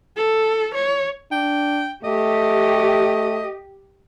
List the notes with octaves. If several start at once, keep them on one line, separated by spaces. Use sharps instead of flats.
A4
C#5
D4 G5
A3 G4 D#5